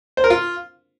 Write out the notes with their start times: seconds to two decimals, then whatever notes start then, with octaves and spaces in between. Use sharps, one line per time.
0.17 C5
0.24 A#4
0.30 F4